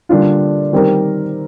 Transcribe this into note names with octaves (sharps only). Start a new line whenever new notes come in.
D3 G3 A#3 D4 F4
D#3 G3 C4 G4 A#4